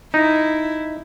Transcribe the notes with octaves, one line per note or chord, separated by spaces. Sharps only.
D#4 E4